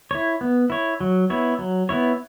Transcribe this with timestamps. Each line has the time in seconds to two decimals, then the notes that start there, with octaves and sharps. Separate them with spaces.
0.11 E4 C#5
0.41 B3
0.70 E4 C#5
1.01 F#3
1.30 B3 E4 C#5
1.59 F#3
1.89 B3 E4 C#5